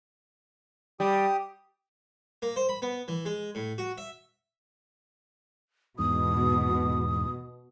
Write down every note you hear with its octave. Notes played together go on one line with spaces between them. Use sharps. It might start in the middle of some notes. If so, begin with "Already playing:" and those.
G3 G4 D#6
A#3
C5
B5
B3
E3
G#3
A2
F#4
E5
E2 G#2 B2 D#6